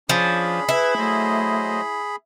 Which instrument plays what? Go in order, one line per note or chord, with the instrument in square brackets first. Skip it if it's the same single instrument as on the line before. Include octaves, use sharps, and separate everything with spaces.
[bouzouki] F3 [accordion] C#4 D4 [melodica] G#4 B5
[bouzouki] E4 [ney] B4
[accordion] F#3 C5 D#5 [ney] A3